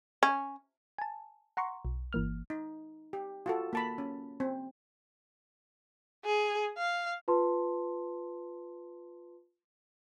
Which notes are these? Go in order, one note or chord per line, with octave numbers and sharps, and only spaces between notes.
C#4
G#5 A5
F#5 A#5 C6 C#6
B1
G1 E3 A#3 F6
D#4
G4
F4 F#4 A4
A#3 A5 B5
C#4
C4
G#4
F5
F4 B4 A5 C6